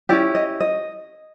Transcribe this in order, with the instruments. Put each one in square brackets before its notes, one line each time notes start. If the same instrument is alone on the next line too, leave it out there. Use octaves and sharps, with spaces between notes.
[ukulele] C#4 E4 G4 D5
D#5
D#5